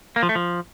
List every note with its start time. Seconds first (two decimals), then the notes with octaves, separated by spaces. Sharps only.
0.16 A#3
0.23 F3
0.29 A3
0.35 F3